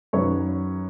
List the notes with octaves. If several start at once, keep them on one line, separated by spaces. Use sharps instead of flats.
F#2 D#3 F#3 B4 C#5